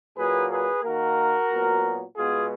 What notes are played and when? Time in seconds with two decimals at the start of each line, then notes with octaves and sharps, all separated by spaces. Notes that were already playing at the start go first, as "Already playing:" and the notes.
0.17 A#2 F#3 A#3 G#4 B4
0.50 G#4 B4
0.83 D#3 A#3 F#4 A#4
1.50 A#2 F#3 B3
2.15 B2 G#3 B3 F4 G#4